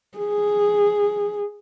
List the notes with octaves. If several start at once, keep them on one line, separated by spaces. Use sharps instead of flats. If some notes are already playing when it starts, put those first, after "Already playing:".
G#4